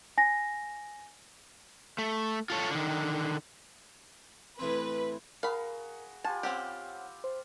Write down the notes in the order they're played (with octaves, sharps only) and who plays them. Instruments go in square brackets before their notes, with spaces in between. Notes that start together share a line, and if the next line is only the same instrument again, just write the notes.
[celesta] G#5 A#6
[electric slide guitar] A3
F4 A4 C#5
D3 D#3
[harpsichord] A2 E3 C4 [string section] B4
[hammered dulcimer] F#4 G#4 B4 [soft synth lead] A#4 [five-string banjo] F5 B5
[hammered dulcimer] F4 G4 B4 [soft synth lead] G#5 [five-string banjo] A5
[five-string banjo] C4 C#4 G4 [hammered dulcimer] A4 [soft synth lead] F#5
[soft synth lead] C5